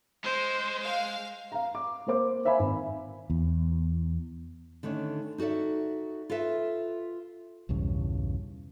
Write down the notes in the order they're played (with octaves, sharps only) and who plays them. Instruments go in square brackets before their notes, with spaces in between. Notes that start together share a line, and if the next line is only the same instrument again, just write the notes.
[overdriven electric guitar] G#3 [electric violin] C5
[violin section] F5
[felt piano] F5 A#5
D6
A#3 A#4 C5 D6
C5 E5 F5 G#5 B5
G#1
[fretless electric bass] E2
[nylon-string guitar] D3 D#3 A3 C#4 D4
D#4 F#4 A4 D5 E5
F4 A4 B4 E5
[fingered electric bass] B1 E2 G2 C#3